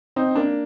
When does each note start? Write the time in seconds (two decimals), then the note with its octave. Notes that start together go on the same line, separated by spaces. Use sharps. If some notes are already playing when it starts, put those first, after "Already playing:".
0.16 C4 D#4
0.35 A#3 D4